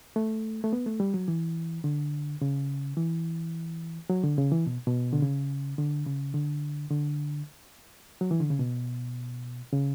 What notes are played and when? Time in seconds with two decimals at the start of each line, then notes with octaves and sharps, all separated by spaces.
0.16 A3
0.64 A3
0.73 B3
0.86 A3
1.00 G3
1.14 F#3
1.28 E3
1.84 D3
2.42 C#3
2.97 E3
4.10 F#3
4.24 D3
4.38 C#3
4.52 E3
4.67 B2
4.87 B2
5.13 D3
5.22 C#3
5.78 D3
6.06 C#3
6.34 D3
6.90 D3
8.21 F#3
8.31 E3
8.40 D3
8.50 C#3
8.59 B2
9.73 C#3